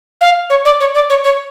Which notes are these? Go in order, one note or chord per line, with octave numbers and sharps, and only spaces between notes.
F5
C#5
D5
C#5
D5
C#5
C#5